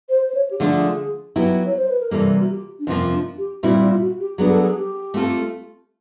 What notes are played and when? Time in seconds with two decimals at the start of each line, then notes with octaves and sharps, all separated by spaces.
0.09 C5
0.29 C5
0.34 C#5
0.51 G4
0.59 D3 F3 A3 D4 G#4
1.36 F#3 B3 E4 G4
1.66 C#5
1.76 C5
1.89 B4
2.00 A#4
2.11 C3 E3 G3 A#3 A4
2.40 F#4
2.49 G4
2.79 D4
2.86 F2 C3 F3 A#3 C#4
3.12 D4
3.38 G4
3.63 A#2 G3 C4 E4 F#4
3.81 F4
4.01 F#4
4.20 G4
4.38 F#3 B3 D4 F#4 G#4
4.51 A4
4.62 G#4
4.77 G4
5.14 A3 C4 F4 A4